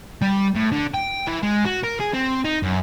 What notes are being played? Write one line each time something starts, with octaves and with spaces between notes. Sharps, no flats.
G3
A2
D3
G5
E3
G#3
F#4
A#4
G#4
C4
D#4
F#2